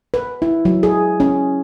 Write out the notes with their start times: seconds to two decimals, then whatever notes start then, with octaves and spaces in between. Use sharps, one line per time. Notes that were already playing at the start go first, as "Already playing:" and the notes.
0.14 B4
0.42 E4
0.65 F#3
0.83 G#4
1.20 C#4